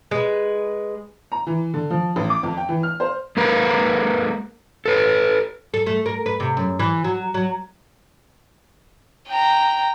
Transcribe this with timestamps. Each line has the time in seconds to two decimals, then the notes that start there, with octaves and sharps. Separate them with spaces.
0.11 G#3 B4
1.32 A#5
1.47 E3
1.74 D3
1.90 F3
2.16 A1
2.30 D6
2.43 F2
2.57 G5
2.69 E3
2.83 F6
3.00 C5
3.37 G#3 A#3 A#4 B4
4.86 A4 B4
5.74 A4
5.86 A3
6.06 A#4
6.26 B4
6.40 C3
6.57 F#2
6.79 E3
7.04 F#3
7.34 F#3
9.28 G5 A#5